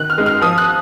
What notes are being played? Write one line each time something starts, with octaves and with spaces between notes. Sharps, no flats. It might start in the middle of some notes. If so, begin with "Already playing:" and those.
Already playing: D#3 F#6
F6
G#3 D#4
F6
F3 D#6
F#6